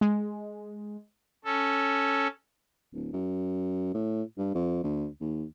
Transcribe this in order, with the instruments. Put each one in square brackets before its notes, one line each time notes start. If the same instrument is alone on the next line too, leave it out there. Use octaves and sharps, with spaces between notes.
[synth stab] G#3
[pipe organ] C#4 A4
[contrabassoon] D1
F#2
A2
G2
F2
D2
D#2